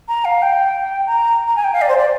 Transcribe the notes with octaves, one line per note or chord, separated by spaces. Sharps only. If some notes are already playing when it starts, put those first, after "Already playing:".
A#5
F5
G5
A#5
A#5
G#5
G5
F5
D5
C5
D5